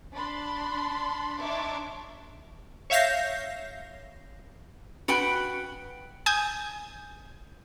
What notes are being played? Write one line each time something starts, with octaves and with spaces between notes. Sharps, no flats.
D4 B5 C6
D4 D#4 C#5 E5 C6 D6
C#5 E5 F5 G6 A#6 C7
F#4 B4 F#5 G5
G#5 D#6 G6